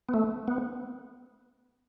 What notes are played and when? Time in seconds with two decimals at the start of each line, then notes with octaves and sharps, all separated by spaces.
0.09 B3
0.14 A3
0.48 B3